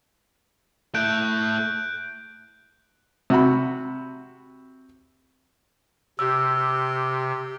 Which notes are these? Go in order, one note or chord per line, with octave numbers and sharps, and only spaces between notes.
A3 E4 F#6 G6 D7
C3 F#4 B5
C3 G4 E6